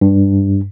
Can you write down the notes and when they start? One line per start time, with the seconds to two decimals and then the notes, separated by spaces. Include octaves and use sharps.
0.01 G2